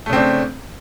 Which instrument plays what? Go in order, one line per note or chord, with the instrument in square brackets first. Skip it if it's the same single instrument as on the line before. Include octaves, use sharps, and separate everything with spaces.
[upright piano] A3
C#3
C4
D4